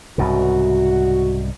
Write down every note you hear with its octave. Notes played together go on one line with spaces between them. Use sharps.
C2 G#2 C#3 F#4